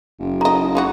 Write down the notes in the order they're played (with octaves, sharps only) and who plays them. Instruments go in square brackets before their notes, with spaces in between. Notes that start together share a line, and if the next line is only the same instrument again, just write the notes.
[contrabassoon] F#1
[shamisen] D#4 D#5 [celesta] A#5
[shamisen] G#3 D#4 F#4